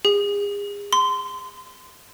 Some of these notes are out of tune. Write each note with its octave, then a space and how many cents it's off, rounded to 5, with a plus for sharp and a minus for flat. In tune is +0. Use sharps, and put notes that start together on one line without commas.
G#4 -35
C6 -25